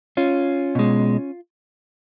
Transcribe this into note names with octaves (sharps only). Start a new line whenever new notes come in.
C#4 F4
B2 G#3